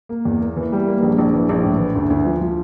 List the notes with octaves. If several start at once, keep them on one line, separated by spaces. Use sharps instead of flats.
A#3
E2
A#3
E3
G3
A#3
A#1
A#1
E3
A#1
A2
E3
D2
D2
F3
F3